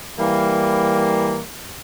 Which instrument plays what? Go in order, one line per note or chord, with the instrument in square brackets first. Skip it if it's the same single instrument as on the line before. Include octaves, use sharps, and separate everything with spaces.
[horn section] E3 G3 A#3